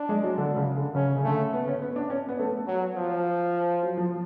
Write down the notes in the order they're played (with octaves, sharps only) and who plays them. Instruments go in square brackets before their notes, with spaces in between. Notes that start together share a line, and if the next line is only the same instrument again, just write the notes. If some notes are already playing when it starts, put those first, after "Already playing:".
Already playing: [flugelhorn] D4
[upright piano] G#3
F#3
D3
C#3
D3
[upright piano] C#3 [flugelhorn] C#4
[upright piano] C#3
[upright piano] D3 [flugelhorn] A3
[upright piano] B3
C#4
B3
D4
C#4
B3
A3
[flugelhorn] F#3
F3
[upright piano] F#3
F3